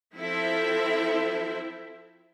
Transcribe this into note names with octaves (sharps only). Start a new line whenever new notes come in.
F3 C4 E4 A4 C5 E5